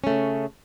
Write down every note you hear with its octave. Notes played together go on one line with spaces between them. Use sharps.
C#3 A3 C#4